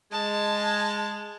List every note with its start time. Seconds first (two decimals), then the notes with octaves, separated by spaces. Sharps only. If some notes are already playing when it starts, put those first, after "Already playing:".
0.12 G#3 A5